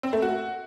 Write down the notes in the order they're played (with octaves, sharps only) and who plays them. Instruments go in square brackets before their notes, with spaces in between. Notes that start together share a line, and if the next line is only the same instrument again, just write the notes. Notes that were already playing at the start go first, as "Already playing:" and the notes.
[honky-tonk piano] C4
A3
F#4